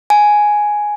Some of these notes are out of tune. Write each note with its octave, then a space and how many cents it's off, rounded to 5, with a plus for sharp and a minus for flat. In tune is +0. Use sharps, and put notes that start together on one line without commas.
G#5 +5